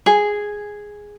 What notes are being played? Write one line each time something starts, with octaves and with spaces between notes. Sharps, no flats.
G#4